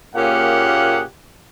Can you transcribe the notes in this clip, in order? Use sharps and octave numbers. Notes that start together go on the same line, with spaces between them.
A#2 A#3 C#4 G4 G#4 F#5